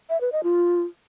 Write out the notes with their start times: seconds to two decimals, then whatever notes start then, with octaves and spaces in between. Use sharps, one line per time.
0.09 E5
0.21 B4
0.32 D#5
0.43 F4